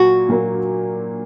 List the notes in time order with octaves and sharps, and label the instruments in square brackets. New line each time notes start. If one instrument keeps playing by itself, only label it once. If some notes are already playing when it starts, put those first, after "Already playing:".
Already playing: [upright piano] A#2 F#3 A#3 [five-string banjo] F#4
[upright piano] A#2 F#3 A#3